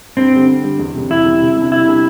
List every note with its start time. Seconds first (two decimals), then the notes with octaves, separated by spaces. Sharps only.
0.17 G2 C4
0.33 D3 G3
0.48 G2
0.64 D3 G3
0.79 E2
0.95 C3 G3
1.10 E2 E4
1.25 C3 G3
1.42 C3
1.57 G3 D4
1.72 C3 E4
1.88 G3 D4